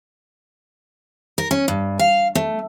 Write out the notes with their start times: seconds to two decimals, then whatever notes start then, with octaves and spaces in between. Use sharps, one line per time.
1.38 A#4
1.51 C#4
1.68 G2
1.99 F5
2.35 A3